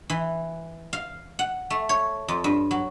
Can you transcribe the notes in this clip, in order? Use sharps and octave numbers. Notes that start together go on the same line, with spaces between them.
E3
F5
F#5
A3
C#5
F2
G2
F#3